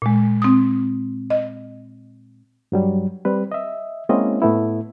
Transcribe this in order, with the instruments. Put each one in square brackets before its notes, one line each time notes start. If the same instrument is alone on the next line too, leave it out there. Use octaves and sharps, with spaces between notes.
[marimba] A#2 G#3
C4 D#6
D#5
[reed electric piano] G2 F#3 G3
G3 C4 B4
D#5 E5
G#3 A#3 C4 C#4 E4 D#5
A2 A3 B3 E4